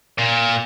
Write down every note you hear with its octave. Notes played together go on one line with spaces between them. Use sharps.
A#2